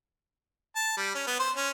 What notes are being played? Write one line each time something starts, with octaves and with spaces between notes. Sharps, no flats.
A5
G3
C#4
B3
C5
C#4